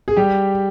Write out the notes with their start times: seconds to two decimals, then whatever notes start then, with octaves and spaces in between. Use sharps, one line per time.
0.08 G#4
0.17 G3 G4